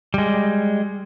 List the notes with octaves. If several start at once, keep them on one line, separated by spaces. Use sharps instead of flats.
G3 G#3